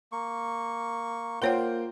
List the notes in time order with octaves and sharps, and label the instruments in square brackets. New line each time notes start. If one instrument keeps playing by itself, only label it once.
[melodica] A#3 C#6
[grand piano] A#3 C5 G5 [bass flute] F4 [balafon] A#4 C#5 F#5